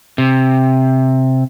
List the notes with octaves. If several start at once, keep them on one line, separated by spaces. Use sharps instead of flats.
C3